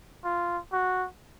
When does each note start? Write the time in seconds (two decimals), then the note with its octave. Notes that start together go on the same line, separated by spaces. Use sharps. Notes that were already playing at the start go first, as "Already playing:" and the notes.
0.24 F4
0.73 F#4